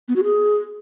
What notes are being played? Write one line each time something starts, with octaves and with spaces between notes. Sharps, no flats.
B3
F#4
G#4